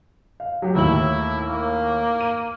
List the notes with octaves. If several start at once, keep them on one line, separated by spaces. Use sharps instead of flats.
F5
F#3 G4
D#2 A2 E4 F#7
A#3
D#7